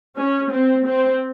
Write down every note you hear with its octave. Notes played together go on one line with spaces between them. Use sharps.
C#4
C4
C4